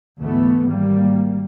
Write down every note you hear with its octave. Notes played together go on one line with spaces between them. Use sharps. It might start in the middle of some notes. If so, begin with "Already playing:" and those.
D2 G#2 E3 A3 B3
G#1 G3 A#3